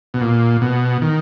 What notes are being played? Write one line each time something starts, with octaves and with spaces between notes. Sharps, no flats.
B2
A#2
B2
D#3